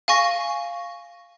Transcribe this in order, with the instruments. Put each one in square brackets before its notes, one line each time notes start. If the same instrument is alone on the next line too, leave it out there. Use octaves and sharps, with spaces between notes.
[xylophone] F5 G#5 C#6 A#6